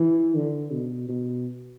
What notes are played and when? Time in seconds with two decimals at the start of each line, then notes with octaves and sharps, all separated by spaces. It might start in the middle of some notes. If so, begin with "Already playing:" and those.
Already playing: E3
0.36 D3
0.72 B2
1.09 B2